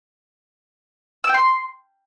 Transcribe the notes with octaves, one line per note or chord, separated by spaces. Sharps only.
E6
G5
C6